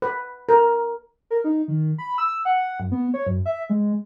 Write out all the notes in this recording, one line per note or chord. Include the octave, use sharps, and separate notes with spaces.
B4
A#4
A#4
D#4
D#3
B5
E6
F#5
F#2
B3
C#5
F#2
E5
G#3